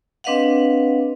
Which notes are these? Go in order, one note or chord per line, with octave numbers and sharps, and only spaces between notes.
C4 D4 B4 D#5 F5 F#5